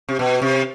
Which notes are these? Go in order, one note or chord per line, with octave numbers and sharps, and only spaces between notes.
C3
B2
C3